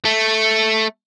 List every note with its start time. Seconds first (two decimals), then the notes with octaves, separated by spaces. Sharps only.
0.05 A3